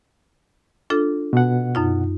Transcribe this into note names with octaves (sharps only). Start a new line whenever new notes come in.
D4 F4 A4
B2 F#5
F#2 D#4 F4